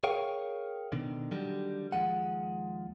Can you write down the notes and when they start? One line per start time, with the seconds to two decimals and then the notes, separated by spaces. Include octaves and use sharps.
0.04 G#4 A#4 C#5 F5 G5
0.92 B2 D3 D#3
1.31 D3 D#3 F#3 G3 G4
1.92 D#2 F3 G#3 F#5